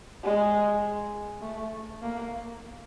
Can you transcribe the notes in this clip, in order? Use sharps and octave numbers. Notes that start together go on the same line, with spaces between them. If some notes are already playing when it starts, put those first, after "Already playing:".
G#3
A3
A#3